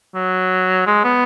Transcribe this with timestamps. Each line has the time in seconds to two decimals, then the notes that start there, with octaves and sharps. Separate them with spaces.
0.15 F#3
0.87 G#3
1.04 B3